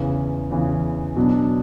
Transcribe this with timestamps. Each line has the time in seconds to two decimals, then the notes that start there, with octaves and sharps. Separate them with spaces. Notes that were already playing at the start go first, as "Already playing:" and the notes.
Already playing: E2 C#3 E3
0.51 E2 C#3 E3
1.16 B2 F#3 B3 D4